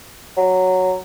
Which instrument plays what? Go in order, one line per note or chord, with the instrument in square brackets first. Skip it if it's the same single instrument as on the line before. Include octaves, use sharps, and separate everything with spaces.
[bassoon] F#3